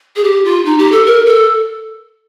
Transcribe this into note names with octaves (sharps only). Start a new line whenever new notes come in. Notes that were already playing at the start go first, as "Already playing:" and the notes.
G#4
G4
F4
D#4
G4
A4
A#4
A4